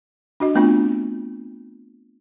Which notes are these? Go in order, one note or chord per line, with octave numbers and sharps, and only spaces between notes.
D4 F#4 D#5
A3 B3 C4 D4 F4